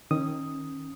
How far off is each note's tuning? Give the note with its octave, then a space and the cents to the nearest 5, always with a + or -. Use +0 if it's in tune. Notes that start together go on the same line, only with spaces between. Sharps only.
D#3 +0 C#4 -30 D#6 +0